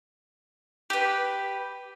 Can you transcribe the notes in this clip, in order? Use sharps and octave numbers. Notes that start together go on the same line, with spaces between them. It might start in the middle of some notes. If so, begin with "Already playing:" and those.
G4 B4